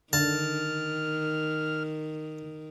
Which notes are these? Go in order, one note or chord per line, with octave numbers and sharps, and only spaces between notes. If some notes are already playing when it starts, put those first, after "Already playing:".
D3 D#3 A5 F6